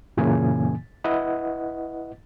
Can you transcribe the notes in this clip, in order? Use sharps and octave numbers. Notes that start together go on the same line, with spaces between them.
F#2 A#2 C#3 E3 A#3 G#5
E4 B4 D#5 F#5